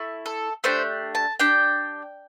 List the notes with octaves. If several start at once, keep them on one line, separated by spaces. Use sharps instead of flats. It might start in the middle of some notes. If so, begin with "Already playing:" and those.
Already playing: A3 E4
A4
A3 D4 G4 C5
A5
D4 G4 G5